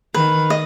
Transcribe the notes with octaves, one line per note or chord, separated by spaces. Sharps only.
D#3 B4
D#5